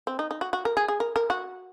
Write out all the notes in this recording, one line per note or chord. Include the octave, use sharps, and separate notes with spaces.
C4
D#4
D#4
F#4
F#4
A#4
G#4
G#4
A#4
A#4
F#4